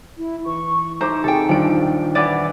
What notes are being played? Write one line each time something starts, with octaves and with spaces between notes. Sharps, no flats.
E4
E3 C#6
A3 D#4 C5 A#5 D6
C3 G#4 A4 G5
D#1 F3 D4 D7
E3 B3 D5